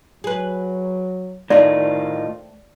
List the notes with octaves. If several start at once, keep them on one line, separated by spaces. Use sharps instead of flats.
F#3 G#4 B4
A2 D#3 A3 C4 D#4 F4 D5